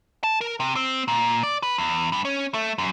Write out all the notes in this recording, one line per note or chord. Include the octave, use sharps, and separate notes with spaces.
A5
A#4
C3
C4
A#2
D5
B4
E2
G2
C#4
A3
F#2